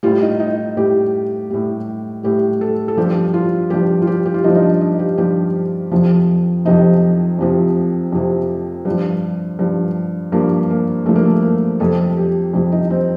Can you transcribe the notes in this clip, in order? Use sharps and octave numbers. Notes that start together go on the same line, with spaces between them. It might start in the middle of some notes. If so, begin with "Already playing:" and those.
A2 G3 F4
D#4
D#4
A2 G3 G4
A2 G3
A2 G3 G4
A4
A4
G2 F3 G4
F4
G2 F3 G4
F4
G4
G4
F4
G2 F3 D#4
D#4
D4
D#4
G4
G2 F3 G4
F2 C3 F3
F2 C3 F3 D#4
F2 C3 F3
F2 C3 F3
G2
F3
G2 F3
G2 F3 A#3
A#3
G2 F3 A3
A#3
A3
A#3
F2 C3 G3 A4
G4
F2 C3 G3
D#4
C4